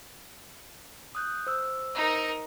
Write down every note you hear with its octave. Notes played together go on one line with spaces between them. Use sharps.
D#6 F#6 G6
C5 E6
D#4 A#4